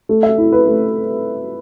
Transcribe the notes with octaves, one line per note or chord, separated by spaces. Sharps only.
A3
E5
E4
B4
A3